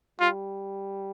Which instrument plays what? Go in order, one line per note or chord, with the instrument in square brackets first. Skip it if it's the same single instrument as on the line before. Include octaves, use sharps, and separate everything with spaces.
[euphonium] G3 [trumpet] F4